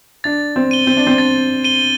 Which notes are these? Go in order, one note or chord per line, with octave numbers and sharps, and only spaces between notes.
D4 A6
C4
D#7 G7
C4
D4
C4
D4 A6
D#7 G7